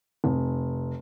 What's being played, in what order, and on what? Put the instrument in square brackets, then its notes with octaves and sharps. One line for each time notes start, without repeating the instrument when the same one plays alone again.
[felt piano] F1